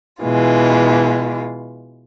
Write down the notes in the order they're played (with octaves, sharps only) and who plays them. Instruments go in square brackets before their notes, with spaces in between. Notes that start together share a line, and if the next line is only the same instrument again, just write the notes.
[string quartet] B2 E3 G#3 F4